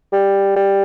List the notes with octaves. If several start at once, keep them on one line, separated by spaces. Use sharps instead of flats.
G3
G3